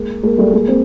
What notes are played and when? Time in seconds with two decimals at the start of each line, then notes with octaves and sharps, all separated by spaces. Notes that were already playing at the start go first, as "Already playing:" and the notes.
Already playing: G#3 A#3
0.23 G#3 A#3
0.38 G3 A3
0.53 G#3 A#3
0.68 A#3 C4